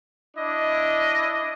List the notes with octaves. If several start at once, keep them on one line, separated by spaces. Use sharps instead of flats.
D4 E4 D#5